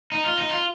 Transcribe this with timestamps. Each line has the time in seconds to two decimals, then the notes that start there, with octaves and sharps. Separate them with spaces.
0.12 D#4
0.25 F4
0.38 D#4
0.51 F4